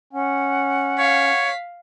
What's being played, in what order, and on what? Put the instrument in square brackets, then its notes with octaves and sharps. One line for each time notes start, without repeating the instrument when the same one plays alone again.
[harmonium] C#4 [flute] F#5
[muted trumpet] C#5 [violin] F5 B6